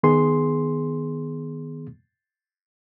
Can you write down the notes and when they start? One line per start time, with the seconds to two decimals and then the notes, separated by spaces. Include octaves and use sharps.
0.03 D#3 B3 G#4 C6